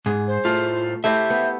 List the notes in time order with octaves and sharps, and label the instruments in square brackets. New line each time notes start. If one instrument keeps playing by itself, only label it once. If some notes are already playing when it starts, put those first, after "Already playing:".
[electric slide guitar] G#2 [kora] G#4
[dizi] C5
[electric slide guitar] A2 F4 [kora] A3
[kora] A3 E4 G4 [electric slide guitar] C5 E5 [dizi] G6
[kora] B3